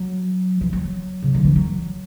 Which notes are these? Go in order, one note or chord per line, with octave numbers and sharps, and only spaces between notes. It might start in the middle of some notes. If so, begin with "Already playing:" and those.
Already playing: F#3
E3
F#3
C#3
D3
E3
F#3